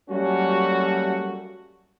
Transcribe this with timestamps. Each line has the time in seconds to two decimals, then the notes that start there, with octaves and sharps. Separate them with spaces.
0.10 F#3 G3 A3 A#3 C#4 F#4